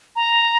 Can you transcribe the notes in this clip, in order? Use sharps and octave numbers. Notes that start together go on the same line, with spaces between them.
A#5